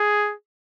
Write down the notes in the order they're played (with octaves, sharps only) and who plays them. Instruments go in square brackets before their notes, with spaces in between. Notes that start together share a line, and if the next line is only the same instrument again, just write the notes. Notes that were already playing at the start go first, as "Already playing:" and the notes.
Already playing: [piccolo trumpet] G#4